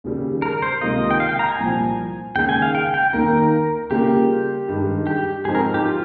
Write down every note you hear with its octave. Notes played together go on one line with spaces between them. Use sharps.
D#2 C#3 G3
A#4
C5
C#2 C3 D#3 A#3 F4 D#5
G5
F5
G5
A#5
G#5
C2 A#2 F3
D#2 C#3 G#3 G5
G#5
F5
G5
G5
D#2 D#3 A#3 A#4
C#3 G3 A#3 F4 G4
G2 D#3 G#3
G4
G#2 F3 C4 D#4 G#4
A#4
G4
F4